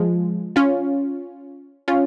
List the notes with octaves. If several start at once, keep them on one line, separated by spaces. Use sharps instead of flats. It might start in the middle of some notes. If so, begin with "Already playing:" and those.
Already playing: F3 G#3
C#4 F4
C#4 F4